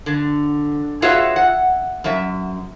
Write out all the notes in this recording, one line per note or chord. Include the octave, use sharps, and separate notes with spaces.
D3
F4 F#4 G#4 B4 C#5 E5
F#5
F#2 E5